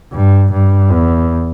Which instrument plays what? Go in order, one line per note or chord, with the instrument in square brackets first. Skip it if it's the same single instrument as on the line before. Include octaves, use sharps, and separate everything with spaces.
[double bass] G2
G2
E2